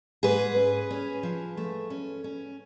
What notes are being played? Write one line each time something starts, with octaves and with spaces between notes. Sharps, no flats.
G#2 G#4 B4
C#4
C#4
F3
A3
C#4
C#4